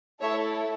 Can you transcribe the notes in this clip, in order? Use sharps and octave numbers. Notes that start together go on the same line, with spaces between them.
A3 E4 A4 C#5 E5